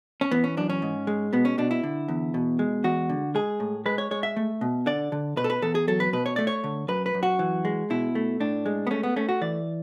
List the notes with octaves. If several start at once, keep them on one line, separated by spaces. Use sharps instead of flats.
C#4
E3 B3
C#4
F#2 D4
C#4
G#2
G#3
B2 B3
C#4
B2 D4
E4
D3
E2
B2
G#3
E2 F#4
D3
G#3 G#4
A2
G#3 B4
C#5
G#3 C#5
E5
A3
B2
D3 D5
D3
B2 B4
A4
B4
E2 A4
G#4
F#3 A4
B4
B2 B4
C#5
A3 D5
C#5
D3
F#2 B4
B4
F#2
F#4
E3
G#3
B2 E4
A3
A2 D4
G#3
B3
A3 C#4
B3
A3 C#4
F#4
E3 D5